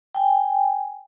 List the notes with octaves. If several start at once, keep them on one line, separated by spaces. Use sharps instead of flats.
G5 G#5